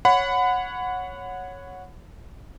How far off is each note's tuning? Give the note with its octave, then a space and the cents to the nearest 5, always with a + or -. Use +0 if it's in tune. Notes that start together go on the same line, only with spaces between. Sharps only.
C#5 +0 F#5 -15 B5 +25